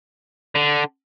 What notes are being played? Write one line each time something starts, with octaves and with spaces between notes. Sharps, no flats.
D3